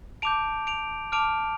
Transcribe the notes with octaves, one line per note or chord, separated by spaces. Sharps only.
A5 D6 G6 D7 F7
D7 F7
A5 D6 F6 D7 F7